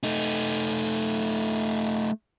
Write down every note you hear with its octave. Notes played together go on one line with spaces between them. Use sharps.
A3 D#4